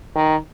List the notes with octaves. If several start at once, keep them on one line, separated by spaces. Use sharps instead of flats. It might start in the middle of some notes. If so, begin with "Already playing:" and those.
D#3